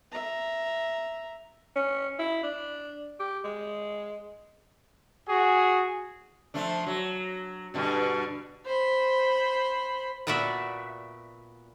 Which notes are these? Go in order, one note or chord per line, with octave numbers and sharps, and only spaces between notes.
E5 A#5
C#4
E4
D4
G4
G#3
F#4 G#4
F3 A3 D4
F#3
G2 B2 D3
C5 B5
A#2 B3 F#4 D5 E5